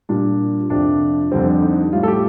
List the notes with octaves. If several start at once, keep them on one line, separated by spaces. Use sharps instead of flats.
A#2 G3 D4
F2 C3 F3 D4
F2 D3 G3 C4
D4
D#4
A2 G3 F4
A4
G4